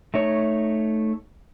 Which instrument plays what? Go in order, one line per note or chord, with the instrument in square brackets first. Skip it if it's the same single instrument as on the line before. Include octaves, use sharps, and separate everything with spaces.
[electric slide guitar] A3 D#4 C#5